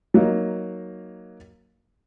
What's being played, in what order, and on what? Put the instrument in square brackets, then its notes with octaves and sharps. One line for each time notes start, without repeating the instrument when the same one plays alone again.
[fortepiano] F#3 A#3 D#4